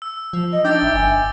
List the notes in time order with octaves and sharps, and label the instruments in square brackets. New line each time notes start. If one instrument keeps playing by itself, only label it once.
[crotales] E6
[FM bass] F3
[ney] D#5
[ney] D4 [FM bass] D#4 [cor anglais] G5 [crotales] D6 E6 A6
[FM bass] A1 [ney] E5
[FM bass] G1 [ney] G#5